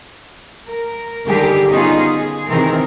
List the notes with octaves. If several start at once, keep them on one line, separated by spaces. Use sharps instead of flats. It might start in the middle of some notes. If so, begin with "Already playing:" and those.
A#4
D3 D#3 G3 G4 G#4 A#4
B3 C#4 D#4 F4 G#4
G#4
C3 D#3 E3 C4 G#4 A#4